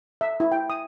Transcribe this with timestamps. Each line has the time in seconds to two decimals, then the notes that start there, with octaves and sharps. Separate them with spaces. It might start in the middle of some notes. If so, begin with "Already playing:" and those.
0.21 E5
0.40 E4
0.52 G5
0.70 D#6